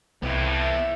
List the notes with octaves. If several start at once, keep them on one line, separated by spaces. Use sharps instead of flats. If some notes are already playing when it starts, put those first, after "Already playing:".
C2 F2 A2 B3 E4
E5